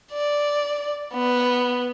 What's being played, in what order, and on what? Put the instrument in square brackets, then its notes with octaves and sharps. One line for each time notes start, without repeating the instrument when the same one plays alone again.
[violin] D5
B3